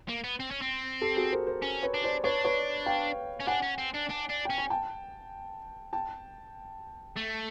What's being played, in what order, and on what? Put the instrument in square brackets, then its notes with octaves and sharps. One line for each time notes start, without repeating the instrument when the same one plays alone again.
[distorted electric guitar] A#3
B3
C4
C#4
C4
[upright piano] G4 A4
F#4 G#4
A#4 C5
A#4 C5
[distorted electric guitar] C#4
[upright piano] B4 C#5
[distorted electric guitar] D4
[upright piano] C5 D5
[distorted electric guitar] D4 [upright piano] B4 C#5
[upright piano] B4 C#5
F5 G5
[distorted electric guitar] C#4
[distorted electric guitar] D4 [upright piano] F#5 G#5
[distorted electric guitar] C#4
C4
D4
D4
D4
[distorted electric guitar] C#4 [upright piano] G5
[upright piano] G#5
G5 A5
G5 A5
[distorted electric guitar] A3